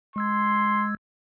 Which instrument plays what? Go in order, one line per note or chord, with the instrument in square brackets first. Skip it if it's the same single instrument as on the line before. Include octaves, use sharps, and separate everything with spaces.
[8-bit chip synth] G#3 E6 G#6 [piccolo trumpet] C6